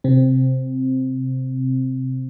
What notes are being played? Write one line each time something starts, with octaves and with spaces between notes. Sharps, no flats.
C3 C4